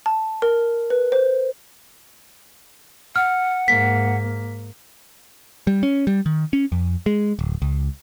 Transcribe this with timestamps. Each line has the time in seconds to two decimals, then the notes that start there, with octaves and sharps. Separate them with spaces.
0.06 A5
0.42 A#4
0.90 B4
1.12 C5
3.16 F#5 F6
3.68 G#2 A#3 B6
5.67 G3
5.83 C#4
6.07 G3
6.26 D#3
6.53 C#4
6.72 F2
7.06 G#3
7.39 D1
7.62 C#2